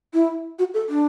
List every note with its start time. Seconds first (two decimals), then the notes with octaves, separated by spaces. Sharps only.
0.14 E4
0.59 F#4
0.74 A4
0.89 D4